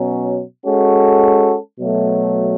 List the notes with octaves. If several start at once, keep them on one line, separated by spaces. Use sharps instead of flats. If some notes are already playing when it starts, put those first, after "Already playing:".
Already playing: B2 F#3 C#4
G#3 C#4 F#4 A4
B2 F#3 A3